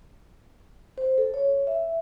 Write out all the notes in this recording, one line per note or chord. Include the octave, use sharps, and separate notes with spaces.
C5
A4
C#5
E5